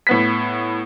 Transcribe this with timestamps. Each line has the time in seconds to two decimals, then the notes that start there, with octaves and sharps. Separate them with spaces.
0.07 A2 B3 B6